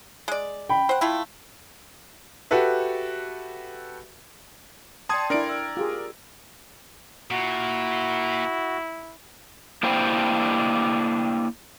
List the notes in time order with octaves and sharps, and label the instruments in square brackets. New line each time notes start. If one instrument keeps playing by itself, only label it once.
[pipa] G#3 D5
[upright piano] G5 B5
[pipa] C5 F#5
A3 E4 F4
[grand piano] F#4 G4 A4 B4 E5
[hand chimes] D5 G5 C6 [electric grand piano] A5 D#6 G#6
[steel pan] D4 E4 [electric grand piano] A#4 D5 D7 [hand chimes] G5
[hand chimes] E6
[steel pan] F4 G4 G#4
[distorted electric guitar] A#2 [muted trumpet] E4 [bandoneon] F#4
[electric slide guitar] A#3 D4 E4 G4 C5 G5